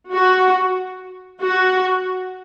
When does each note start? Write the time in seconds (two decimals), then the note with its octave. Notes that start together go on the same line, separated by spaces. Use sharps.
0.12 F#4
1.42 F#4